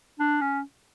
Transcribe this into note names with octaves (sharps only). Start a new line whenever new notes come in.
D4
C#4